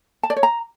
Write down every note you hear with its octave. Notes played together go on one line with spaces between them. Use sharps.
A5
D5
C#5
A#5